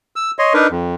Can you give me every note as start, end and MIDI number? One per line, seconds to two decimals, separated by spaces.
0.16 0.31 88
0.39 0.53 73
0.39 0.53 75
0.39 0.53 84
0.54 0.67 62
0.54 0.67 63
0.54 0.67 70
0.54 0.67 71
0.71 0.95 41